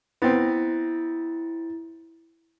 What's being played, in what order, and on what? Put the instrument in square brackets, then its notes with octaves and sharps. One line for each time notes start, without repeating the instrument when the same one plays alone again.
[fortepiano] B3 C4 [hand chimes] E4 A6